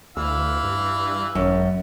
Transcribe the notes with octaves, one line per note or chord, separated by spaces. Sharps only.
D2 E3 F5 E6
G2
G#1 F#2